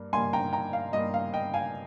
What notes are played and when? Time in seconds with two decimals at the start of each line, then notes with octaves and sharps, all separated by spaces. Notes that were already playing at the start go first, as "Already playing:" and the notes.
Already playing: G2 A#3
0.13 G2 G3 A#3 G#5 C6
0.33 G5 A#5
0.53 G5 A#5
0.73 F5
0.93 G2 G3 A#3 D#5
1.14 F5
1.34 D#5 G5
1.54 F5 G#5